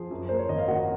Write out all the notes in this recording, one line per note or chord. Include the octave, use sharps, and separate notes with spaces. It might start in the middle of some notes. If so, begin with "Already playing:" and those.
Already playing: F3 G#4
F#2
A#3 C5
C#5
G#1 D#5
F5
A#3 F#4 F#5